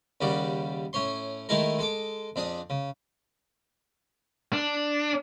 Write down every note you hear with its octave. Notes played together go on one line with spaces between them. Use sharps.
D#2 C#3 G3 F#4 D5
A2 C#4 C#5 C6
D#3 G#3 A3 E4 A4 A#4
G#3 A4 D6
F2 D4 G#4 D#6
C#3
D4